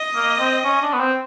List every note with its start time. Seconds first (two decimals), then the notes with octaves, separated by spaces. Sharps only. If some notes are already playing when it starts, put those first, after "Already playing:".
Already playing: D#5
0.16 A#3
0.39 C4
0.64 C#4
0.82 D4
0.93 B3
1.00 C4